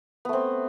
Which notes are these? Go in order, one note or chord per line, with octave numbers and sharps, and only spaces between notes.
A3 B3 C4